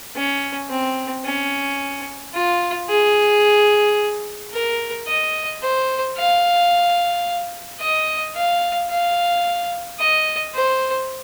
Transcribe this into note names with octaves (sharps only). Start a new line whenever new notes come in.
C#4
C4
C#4
F4
G#4
A#4
D#5
C5
F5
D#5
F5
F5
D#5
C5